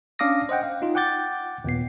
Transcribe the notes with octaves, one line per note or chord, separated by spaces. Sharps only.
C#4 D4 F5 D6 D#6 A#6
C5 D#5 F#5 G5
F5
D#4 F4
F#5 G5 D6 G6 A6
D#2 A#2 B3 C7